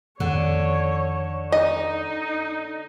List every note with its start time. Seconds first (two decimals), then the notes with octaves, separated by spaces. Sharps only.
0.20 F2 D3 D#3 C#5
1.52 D#4 D#5